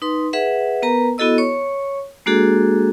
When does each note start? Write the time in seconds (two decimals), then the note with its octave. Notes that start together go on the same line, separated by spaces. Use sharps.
0.02 D#4 B4 C6
0.33 G#4 B4 E5 F#5
0.83 B3 A#4 B4 A#5
1.18 B3 E4 F#4 A4 D#5 E6
1.38 C#5 C#6
2.26 G#3 A#3 D4 F#4 G#4 A4